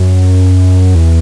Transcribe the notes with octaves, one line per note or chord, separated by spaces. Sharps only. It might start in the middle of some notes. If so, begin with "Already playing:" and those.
Already playing: F#2
E2